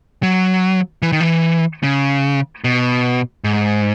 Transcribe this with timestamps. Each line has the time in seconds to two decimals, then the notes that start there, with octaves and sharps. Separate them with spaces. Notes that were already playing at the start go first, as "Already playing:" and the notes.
0.23 F#3
1.02 E3
1.12 D#3
1.20 E3
1.83 C#3
2.64 B2
3.44 G#2